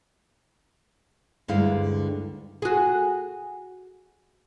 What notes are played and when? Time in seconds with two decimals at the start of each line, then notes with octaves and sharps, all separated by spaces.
1.48 D2 G2 D3 G#3 E4 F5
2.62 F#4 G#4